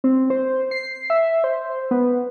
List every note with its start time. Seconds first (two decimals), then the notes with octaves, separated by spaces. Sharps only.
0.04 C4
0.30 C5
0.71 C7
1.10 E5
1.44 C5
1.91 B3